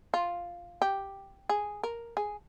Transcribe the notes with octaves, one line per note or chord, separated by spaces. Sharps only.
F4
G4
G#4
A#4
G#4